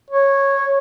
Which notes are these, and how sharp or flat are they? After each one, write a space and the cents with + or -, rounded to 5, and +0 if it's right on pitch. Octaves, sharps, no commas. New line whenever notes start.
C#5 -10